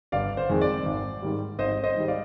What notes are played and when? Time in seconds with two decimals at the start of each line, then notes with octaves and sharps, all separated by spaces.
0.12 G1 D5 F5
0.37 C5
0.49 F2 D#3 G#3
0.61 D5
0.86 G#1
1.22 G#2 D#3 G3
1.59 G#1 C5 D#5
1.84 C5 D#5
1.96 G#2 D#3 G3
2.08 D5 F5